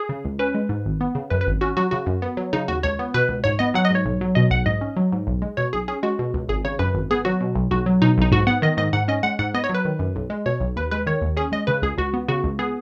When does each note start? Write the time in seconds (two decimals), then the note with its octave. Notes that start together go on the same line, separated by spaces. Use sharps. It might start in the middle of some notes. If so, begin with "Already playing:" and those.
Already playing: G#4
0.09 C#3
0.25 C#2
0.39 C#4 B4
0.55 G#3
0.69 G#2
0.86 G#1
1.01 B3
1.15 C#3
1.30 F#2 B4
1.41 B4
1.47 G#1
1.61 C#4 F#4
1.77 F#3 F#4
1.91 C#3 F#4
2.06 F#2
2.22 B3
2.37 F#3
2.53 C#3 D#4
2.68 D#2 F#4
2.83 C#2 C#5
2.99 B3
3.14 B2 B4
3.29 C#2
3.44 G#2 C#5
3.59 B3 D#5
3.74 F#3 F#5
3.85 D#5
3.90 G#2 C#5
4.05 B1
4.21 F#3
4.35 B2 D#5
4.50 B1 F#5
4.66 G#2 D#5
4.81 C#4
4.97 F#3
5.12 G#2
5.27 B1
5.42 G#3
5.57 B2 C#5
5.73 B1 G#4
5.88 C#4 G#4
6.03 G#3 F#4
6.19 B2
6.34 C#2
6.49 G#1 G#4
6.64 C#3 C#5
6.79 F#2 B4
6.94 G#1
7.11 B3 G#4
7.25 F#3 F#4
7.41 B2
7.55 B1
7.71 B1 F#4
7.86 F#3
8.02 B2 D#4
8.18 B1 D#4
8.32 G#2 F#4
8.47 B3 F#5
8.62 D#3 D#5
8.77 G#2 D#5
8.93 G#2 F#5
9.08 C#4 D#5
9.23 G#3 F#5
9.39 G#2 F#5
9.54 B3 D#5
9.64 C#5
9.69 F#3
9.75 B4
9.85 D#3
9.99 F#2
10.16 B1
10.30 G#3
10.46 B2 C#5
10.60 B1
10.76 D#2 B4
10.91 G#3 B4
11.06 D#3 C#5
11.21 D#2
11.37 C#4 G#4
11.52 G#3 D#5
11.67 C#3 B4
11.82 C#2 G#4
11.98 C#2 F#4
12.14 B3
12.28 C#3 F#4
12.44 C#2
12.59 B3 G#4